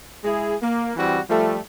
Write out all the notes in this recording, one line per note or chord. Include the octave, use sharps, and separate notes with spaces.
G#3 E4 G#4
A#3
E3 G3 C4 F#4
F3 G3 A3